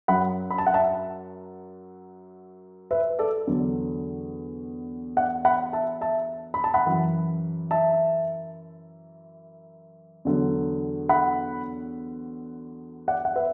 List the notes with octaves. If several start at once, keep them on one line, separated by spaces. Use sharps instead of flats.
F#2 F#3 F#5 B5
B5
A5
F#5
E5 A5
B4 E5
A4 D5
E2 D3 F#3
D5 F#5
F#5 B5
E5 A5
E5 A5
B5
A5
F#5 B5
F#2 E3
E5 A5
E2 D3 F#3
F#5 B5
D5 F#5
F#5
B4 E5